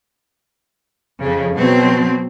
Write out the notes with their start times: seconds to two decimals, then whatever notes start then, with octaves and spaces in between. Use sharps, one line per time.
1.20 F2 C#3
1.55 B2 F#3 C4